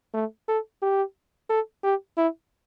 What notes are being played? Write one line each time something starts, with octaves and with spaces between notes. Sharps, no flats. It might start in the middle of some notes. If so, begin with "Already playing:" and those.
A3
A4
G4
A4
G4
E4